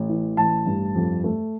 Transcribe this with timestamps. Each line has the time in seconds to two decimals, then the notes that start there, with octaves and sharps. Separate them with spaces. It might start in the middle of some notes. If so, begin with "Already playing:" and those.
Already playing: A1
0.09 E3
0.37 A1 A5
0.66 G2
0.95 F2
1.24 A3